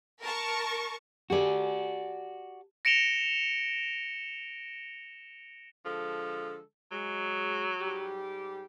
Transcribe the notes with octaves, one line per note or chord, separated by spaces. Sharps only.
A#4 A5 C#6
F#4 G4 A4 D5 G#5
A#6 C#7 D7 E7 F7 G7
D3 F3 G#3 A4
F#3 G#3
G#2 G3 G4